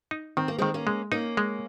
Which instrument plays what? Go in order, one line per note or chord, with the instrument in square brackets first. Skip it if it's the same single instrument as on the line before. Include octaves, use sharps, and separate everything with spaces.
[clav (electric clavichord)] D#4
[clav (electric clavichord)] D#3 [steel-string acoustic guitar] C4
[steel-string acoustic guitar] A#3
[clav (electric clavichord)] D#3 [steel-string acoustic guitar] G#3 C4
[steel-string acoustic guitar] A#3 C#4
[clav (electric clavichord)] G#3
[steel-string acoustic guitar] A#3 C#4 [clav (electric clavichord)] D#4
[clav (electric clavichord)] G#3